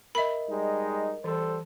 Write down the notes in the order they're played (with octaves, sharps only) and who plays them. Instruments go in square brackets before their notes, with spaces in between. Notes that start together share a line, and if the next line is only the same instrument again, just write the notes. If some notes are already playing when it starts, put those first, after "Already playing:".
[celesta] A#4 D#5 [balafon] E5 B5
[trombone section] G3 G#3 D#4
[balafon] E3 [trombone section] G3 A4 C5